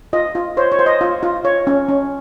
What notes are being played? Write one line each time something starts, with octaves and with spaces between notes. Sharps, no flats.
F4 D#5
F4
C5 C#5
C#5
C5
D#5
F4
F4
C#5
C#4
C#4